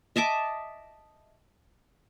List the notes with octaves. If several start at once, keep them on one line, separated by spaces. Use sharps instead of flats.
D#5 E5 A5 D6